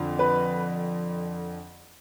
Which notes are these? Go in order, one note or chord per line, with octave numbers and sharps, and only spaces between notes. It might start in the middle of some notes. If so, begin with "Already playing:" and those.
Already playing: F2 D3
B4